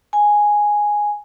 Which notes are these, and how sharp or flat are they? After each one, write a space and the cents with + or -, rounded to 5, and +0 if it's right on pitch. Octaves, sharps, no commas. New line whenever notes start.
G#5 +0